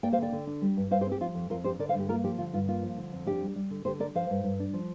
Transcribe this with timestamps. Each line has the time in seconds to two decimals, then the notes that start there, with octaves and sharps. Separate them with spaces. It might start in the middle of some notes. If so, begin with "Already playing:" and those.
0.03 A#3 D5 G5
0.13 C5 F5
0.18 D3 D5 G5
0.32 D3
0.47 D4
0.62 G3
0.77 G2
0.91 G2 C5 F5
1.01 G4 C5
1.06 C4
1.12 G4
1.21 F3 F4
1.35 F2
1.50 F2 F4 A#4
1.64 D4 G4 C5
1.79 D3 A#4 D5
1.89 C5 F5
1.94 G2
2.00 G4
2.09 A#3 F4 A#4
2.24 F3 G4
2.38 D3 F4
2.53 G2 F4
2.68 A#3 F4
2.82 F3
2.97 D3
3.13 F2
3.26 D4 G4
3.42 G3
3.56 G3
3.71 D3
3.85 D3 G4 C5
4.00 D4 A#4 D5
4.15 F3 C5 F5
4.30 G2
4.44 G2
4.60 D4
4.73 F3